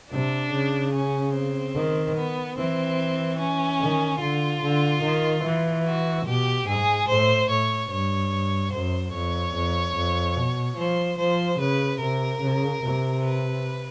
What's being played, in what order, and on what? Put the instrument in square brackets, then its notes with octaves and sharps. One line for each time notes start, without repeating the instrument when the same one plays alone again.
[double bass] C3 [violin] D4
[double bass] C#3
[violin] C#4
C4
[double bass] D#3
[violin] B3
[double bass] E3 [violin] C4
[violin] C#4
[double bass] D#3
[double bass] D3 [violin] F4
[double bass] D3
D#3
E3
[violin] F#4
[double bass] B2 [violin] G4
[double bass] G#2 [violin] G#4
[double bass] A2 [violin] C5
[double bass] A2 [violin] C#5
[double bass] G2 [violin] C#5
[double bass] F#2 [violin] C5
[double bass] F2 [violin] C#5
[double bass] F2
F2
B2
[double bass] F3 [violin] C5
[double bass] F3 [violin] C5
[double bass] C#3 [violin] B4
[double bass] C3 [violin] A#4
[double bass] C#3
C3
[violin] B4